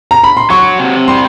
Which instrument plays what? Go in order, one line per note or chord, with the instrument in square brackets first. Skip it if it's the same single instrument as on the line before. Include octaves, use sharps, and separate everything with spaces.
[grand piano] A#5
B5
C6
[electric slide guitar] F#3 [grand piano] C#6
[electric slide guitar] C3
[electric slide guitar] G3 [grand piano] C6